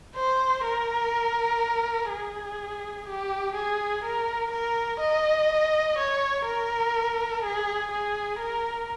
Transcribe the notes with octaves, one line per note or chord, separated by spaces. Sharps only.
C5
A#4
G#4
G4
G#4
A#4
A#4
D#5
C#5
A#4
G#4
G#4
A#4